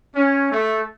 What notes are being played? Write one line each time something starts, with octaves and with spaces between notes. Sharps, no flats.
C#4
A3